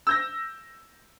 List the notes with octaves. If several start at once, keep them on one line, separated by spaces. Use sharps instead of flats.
E6 G6 A#6